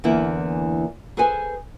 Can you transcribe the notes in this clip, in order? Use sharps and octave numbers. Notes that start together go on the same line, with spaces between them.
E2 D3 E3 A#3 E4
G#4 A4 B4 C5 G#5